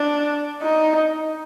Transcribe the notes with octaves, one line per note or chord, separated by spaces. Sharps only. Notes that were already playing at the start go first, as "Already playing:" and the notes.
Already playing: D4
D#4